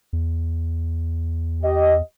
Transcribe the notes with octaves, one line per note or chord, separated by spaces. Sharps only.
E2
G4 D#5